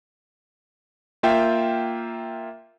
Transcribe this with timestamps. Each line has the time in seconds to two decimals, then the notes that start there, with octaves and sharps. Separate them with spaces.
1.23 A#3 F4 E5 G5